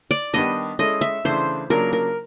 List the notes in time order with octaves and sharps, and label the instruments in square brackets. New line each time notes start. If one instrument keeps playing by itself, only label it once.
[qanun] D5
[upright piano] D#3 G3 B3 D4 [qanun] D#5
[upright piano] G#3 C#4 E4 A4 [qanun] D#5
[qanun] E5
[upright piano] C#3 E3 A3 D4 [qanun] C5
[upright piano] C#3 F#3 A#3 D4 F4 [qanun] A#4
[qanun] A#4